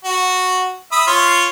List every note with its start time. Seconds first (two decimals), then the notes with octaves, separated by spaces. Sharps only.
0.04 F#4
0.92 E5 B5 D#6
1.07 F4 C#5 C6